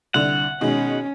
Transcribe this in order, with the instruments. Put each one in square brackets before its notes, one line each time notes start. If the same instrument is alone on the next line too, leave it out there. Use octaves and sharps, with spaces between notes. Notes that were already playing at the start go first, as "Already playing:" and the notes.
[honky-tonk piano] C2 D3 F7 [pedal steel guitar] F#5
[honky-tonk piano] B2 D#3 G#3 [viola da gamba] C#4